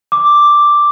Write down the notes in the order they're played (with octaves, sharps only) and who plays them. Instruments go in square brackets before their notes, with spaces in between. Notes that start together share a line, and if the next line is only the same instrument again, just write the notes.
[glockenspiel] D6